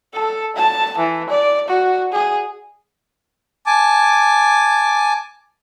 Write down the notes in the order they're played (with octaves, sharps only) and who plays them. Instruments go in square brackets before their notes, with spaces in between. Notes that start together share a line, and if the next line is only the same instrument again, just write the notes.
[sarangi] A4
A5
E3
D5
F#4
G#4
[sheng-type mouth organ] G#5 A5 D6